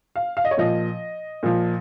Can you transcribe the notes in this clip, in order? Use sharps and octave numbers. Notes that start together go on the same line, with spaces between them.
F5
F5
D#5
C#5
A#2 F3 D#5
A#2 F3